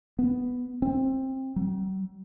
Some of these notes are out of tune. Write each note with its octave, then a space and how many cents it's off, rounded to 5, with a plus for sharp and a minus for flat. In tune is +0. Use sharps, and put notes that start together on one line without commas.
B3 +5
C4 +20
F#3 +45